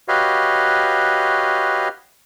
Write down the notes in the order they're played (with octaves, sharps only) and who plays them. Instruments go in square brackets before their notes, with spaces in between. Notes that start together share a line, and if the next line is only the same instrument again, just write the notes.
[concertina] F#4 G4 B4 C#5 D#5 F5